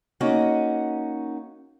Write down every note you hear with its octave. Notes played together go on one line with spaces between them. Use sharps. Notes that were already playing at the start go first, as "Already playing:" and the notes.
A#3 C#4 D#4 F#4 F#5